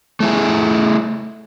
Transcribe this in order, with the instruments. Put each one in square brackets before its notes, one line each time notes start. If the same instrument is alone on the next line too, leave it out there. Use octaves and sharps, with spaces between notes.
[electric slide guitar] A3 E4 G#4